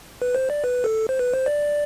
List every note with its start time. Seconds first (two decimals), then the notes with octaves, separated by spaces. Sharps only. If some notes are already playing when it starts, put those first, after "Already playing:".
0.22 B4
0.35 C5
0.50 D5
0.64 B4
0.84 A4
1.09 C5
1.19 B4
1.34 C5
1.46 D5